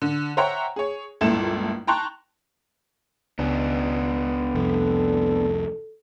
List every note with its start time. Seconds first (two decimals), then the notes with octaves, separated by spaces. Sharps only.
0.02 D3
0.37 C5 C#5 E5 F#5 G5 A#5
0.76 G#4 C#5
1.21 G1 C#2 A#2 E4 A4 E7
1.87 G5 A5 A#5 C6 C#6 F#6
3.39 C#2 B3 D4
4.55 C2 F2 A4